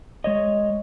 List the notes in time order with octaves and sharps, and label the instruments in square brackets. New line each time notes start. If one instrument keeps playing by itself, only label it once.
[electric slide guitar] G#3 C#5 D#5